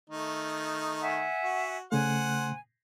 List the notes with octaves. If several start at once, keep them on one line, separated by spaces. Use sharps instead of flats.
D#3 A3 D#4
E5 F#5 G#5
F#4
C#3 A3 C5 F#5 G#5